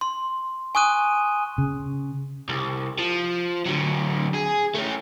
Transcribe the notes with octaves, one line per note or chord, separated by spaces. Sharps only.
C6
G#5 C#6 D#6 F#6 D#7
C#3
C2
F3
D3 F#3
G#4
A3 C#4